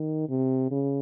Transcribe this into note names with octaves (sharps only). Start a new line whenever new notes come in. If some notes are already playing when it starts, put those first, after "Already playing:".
Already playing: D#3
C3
C#3